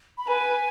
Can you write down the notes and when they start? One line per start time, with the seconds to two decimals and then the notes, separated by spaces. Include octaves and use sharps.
0.18 B5
0.27 B4 G#5